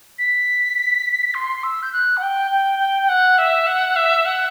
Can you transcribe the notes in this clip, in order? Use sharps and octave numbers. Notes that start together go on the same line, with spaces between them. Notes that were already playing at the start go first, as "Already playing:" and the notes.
B6
C6
E6
G6
F#6
F#5
G5
G5
G5
G5
F#5
E5
F#5
E5
F#5